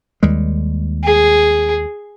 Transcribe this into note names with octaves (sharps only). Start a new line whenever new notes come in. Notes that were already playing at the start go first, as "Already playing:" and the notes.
D#2 G3 G#3
G#4